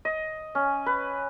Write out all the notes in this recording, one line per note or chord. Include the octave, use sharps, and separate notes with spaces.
D#5
C#4
B4